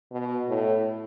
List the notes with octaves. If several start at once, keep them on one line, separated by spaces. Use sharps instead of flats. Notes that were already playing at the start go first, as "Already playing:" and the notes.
B2
A2